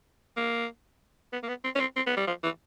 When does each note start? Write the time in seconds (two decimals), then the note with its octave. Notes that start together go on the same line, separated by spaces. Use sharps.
0.37 A#3
1.33 B3
1.43 A#3
1.48 B3
1.64 C4
1.75 C#4
1.80 C4
1.96 C4
2.06 B3
2.17 G3
2.27 F3
2.44 E3